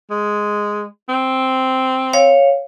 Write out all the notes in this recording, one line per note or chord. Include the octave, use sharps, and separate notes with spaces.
G#3
C4
C#5 F5